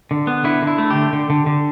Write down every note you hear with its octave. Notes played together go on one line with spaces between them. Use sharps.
D3
B3
D3 E4
D3
E4
A3
D3 G4
D3
D3
D3